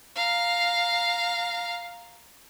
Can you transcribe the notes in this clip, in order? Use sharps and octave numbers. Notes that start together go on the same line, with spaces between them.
F5 A#5